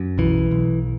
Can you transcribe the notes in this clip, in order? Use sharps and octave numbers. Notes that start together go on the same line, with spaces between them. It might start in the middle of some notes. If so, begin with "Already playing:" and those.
Already playing: F#2
B1 E3
B1